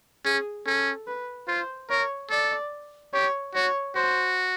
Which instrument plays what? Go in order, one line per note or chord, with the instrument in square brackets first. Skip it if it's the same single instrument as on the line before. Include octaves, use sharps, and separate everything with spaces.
[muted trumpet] C#4 [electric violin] G#4
[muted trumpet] C#4 [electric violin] A4
[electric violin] B4
[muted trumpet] F4 [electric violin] C5
[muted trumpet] A#4 [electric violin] C#5
[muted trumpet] A4 [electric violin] D5
[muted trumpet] G4 [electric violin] C#5
[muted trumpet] F#4 [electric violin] C#5
[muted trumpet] F#4 [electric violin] C5